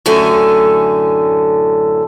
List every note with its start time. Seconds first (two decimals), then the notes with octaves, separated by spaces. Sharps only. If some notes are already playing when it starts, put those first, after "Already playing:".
0.06 F#2 A2 D3 A3 G#5